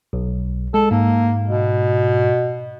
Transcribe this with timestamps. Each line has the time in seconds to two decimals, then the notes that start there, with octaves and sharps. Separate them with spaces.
0.13 B1
0.74 G#3 A4
0.91 G#2 A#3
1.47 B2